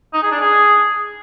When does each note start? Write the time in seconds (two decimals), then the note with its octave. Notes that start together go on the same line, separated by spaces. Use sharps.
0.14 D#4
0.23 G#4
0.32 D4
0.41 G#4